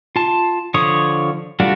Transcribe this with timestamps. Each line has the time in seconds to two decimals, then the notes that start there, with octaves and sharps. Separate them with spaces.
0.16 F4 A5
0.74 D3 F3 C#5 D#6
1.60 G3 A3 D4 F4 F#4